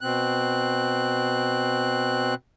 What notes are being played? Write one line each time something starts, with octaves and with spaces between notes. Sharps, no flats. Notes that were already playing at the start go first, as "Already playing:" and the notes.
B2 C4 F#6